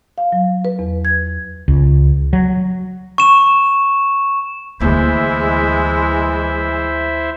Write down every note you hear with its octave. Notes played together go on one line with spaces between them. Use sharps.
F5
F#3
B4
E2
G#6
C#2
F#3
C#6 E7
D2 E3 G#3 A#3 E4 C5 E5